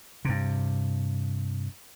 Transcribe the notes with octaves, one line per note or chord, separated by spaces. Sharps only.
G2 C3